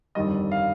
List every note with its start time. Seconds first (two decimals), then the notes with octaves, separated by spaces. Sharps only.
0.15 G1 F2 D#3 G3 D#5
0.52 F5